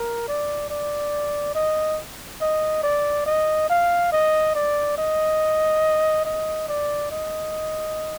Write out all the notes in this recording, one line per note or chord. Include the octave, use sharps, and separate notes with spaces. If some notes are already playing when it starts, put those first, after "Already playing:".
Already playing: A#4
D5
D5
D#5
D#5
D5
D#5
F5
D#5
D5
D#5
D#5
D5
D#5